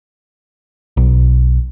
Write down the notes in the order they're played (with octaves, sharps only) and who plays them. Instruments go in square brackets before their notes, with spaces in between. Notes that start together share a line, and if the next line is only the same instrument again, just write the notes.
[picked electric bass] B1